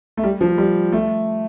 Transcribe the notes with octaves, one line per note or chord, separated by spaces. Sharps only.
A3
G3
F3
G3
A3